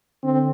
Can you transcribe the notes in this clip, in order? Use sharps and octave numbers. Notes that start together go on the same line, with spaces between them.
D3 C4